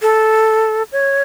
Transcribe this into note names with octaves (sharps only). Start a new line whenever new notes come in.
A4
C#5